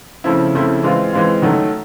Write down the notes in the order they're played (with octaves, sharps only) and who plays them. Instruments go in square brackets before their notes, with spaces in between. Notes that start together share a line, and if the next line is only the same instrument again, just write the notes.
[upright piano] C#3 F3 A3 C4 E4
C#3 F3 A3 C4 E4
E3 G#3 C4 F4
E3 G#3 C4 F4
D#3 F#3 A3